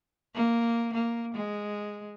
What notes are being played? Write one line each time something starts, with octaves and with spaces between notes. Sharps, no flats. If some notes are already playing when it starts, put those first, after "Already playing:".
A#3
A#3
G#3